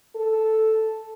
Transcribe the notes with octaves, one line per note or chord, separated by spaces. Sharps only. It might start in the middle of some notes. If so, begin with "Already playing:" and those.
A4